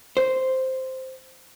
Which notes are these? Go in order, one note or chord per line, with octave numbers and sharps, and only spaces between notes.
C5